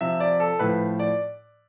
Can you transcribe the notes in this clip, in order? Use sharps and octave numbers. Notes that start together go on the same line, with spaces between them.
C3 F3 E5
D5
A4
A2 F3 B4
D5